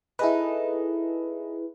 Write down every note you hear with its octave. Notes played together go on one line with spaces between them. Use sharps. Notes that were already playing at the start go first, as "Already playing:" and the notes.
D#4 E4 G#4 A4 B4